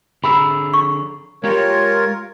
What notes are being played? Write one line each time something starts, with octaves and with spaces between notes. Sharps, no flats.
D3 G#4 A#5 B5 D6 E6
C#6
G#3 F4 G4 A#4 C#5